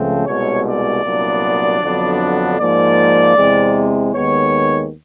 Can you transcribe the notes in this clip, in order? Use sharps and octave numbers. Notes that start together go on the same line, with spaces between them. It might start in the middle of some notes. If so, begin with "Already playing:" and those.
Already playing: C#2 C#3 F3 A3 C4
C2 B2 G#3 C#5
D5
C2 A#2 F#3 B3 D4
F2 D3 F#3 B3 D4
G#2 F3 A#3 D5
E2 C3 E3 G#3 C4
D#2 D#3 G#3 B3 C#5